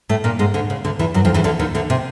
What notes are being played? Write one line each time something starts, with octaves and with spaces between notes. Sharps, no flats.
A2 A3
A#2 A#3
G#2 G#3
D2 D3
C#3
D2 D3
E2 E3
F#2 F#3
F2 F3
E2 E3
D2 D3
D#2 D#3
D2 D3
C3